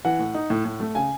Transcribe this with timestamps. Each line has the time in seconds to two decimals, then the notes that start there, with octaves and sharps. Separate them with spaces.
0.05 E3 F#5
0.19 A2
0.34 D#4
0.50 A2
0.65 A2
0.80 A3
0.95 C#3 G#5